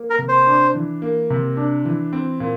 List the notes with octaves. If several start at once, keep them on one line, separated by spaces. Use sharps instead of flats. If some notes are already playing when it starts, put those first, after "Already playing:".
Already playing: A#3
A#4
C3
C5
D4
E3
A#3
C3
D4
E3
C4
A#2